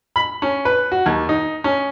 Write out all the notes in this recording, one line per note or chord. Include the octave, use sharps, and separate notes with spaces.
B5
C#4
B4
F#4
D#2
D#4
C#4